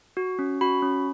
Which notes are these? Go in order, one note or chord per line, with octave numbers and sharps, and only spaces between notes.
F#4
C#4
F#4 B5
C#4